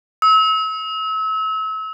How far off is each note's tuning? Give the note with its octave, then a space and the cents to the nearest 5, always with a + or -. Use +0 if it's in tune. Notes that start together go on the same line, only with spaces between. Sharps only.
E6 -35